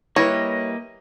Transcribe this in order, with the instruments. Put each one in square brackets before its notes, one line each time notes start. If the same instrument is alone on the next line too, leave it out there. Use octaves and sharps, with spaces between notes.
[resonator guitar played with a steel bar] G3 E4 B4 [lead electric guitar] A#3 D#5 [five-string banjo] C#5